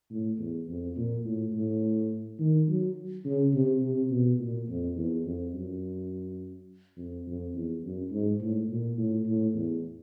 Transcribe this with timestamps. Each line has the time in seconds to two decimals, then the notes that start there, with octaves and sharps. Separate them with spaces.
0.11 A2
0.39 E2
0.68 F2
0.97 A#2
1.25 A2
1.53 A2
2.39 D#3
2.68 F#3
3.25 C#3
3.54 C3
3.82 C3
4.10 B2
4.39 A#2
4.69 F2
4.96 E2
5.25 F2
5.54 F#2
6.97 F2
7.27 F2
7.55 E2
7.84 F#2
8.11 G#2
8.40 A2
8.69 A#2
8.97 A2
9.27 A2
9.55 E2